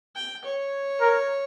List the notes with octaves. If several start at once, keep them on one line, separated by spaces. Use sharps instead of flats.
G5
C#5
A#4